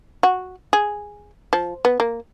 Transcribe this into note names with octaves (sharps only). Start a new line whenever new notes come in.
F#4
G#4
F3
B3
A#3